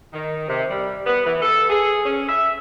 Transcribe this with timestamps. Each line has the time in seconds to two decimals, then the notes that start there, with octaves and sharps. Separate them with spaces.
0.13 D#3
0.49 C3
0.69 G3
1.06 B3
1.26 E3
1.42 A4
1.70 G#4
2.06 C#4
2.28 E5